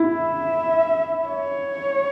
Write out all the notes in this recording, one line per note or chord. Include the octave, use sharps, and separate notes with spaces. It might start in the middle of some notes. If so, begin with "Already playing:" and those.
Already playing: E4
E5
C#5